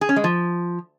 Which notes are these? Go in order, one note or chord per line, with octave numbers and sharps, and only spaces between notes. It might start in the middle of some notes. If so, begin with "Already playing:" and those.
G#4
C#4
G#3
F3